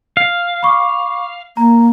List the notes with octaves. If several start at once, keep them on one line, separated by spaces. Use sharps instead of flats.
F5
B5 C#6 D6
A#3 A#5